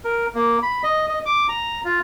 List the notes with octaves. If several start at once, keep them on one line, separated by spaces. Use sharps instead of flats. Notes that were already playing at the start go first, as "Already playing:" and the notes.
A#4
A#3
B5
D#5
D#5
D6
A#5
F4